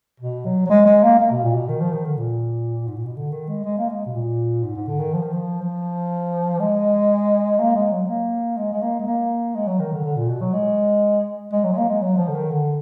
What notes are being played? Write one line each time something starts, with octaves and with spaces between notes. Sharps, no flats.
B2
F#3
F#3
G#3
G#3
A#3
A#3
B2
A#2
B2
D#3
F3
D#3
D3
A#2
G#2
A#2
B2
D3
D#3
G#3
G#3
A#3
G#3
B2
A#2
G#2
G#2
D3
D#3
F3
D#3
F3
F3
G#3
A#3
G#3
F#3
A#3
G#3
G#3
A#3
G#3
A#3
G#3
F#3
D#3
D3
D3
A#2
B2
F#3
G#3
G#3
F#3
G#3
A#3
G#3
F#3
F3
D3
D#3
D3